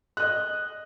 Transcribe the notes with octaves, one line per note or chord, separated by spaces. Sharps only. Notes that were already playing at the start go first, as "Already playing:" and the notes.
D#5 F#6